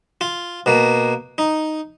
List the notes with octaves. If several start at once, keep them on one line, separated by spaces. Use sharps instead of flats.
F4
B2 A#3
D#4